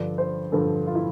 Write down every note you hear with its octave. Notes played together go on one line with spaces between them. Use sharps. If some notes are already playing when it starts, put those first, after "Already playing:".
Already playing: G2 D3 F3 D5
C5
G2 D3 F3 A4
F4
E4